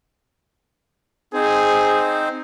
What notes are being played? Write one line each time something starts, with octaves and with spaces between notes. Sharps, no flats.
C4 D#4 G#4 C5